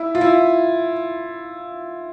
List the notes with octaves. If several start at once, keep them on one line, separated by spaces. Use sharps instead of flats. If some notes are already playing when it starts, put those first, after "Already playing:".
Already playing: E4
F4
E4